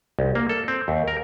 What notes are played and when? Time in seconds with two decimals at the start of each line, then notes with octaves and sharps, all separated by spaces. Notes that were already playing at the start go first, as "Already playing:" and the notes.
0.19 C2
0.35 A#3
0.49 A4
0.68 C4
0.88 D#2
1.08 A#4